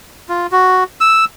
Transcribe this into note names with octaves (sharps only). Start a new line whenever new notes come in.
F4
F#4
E6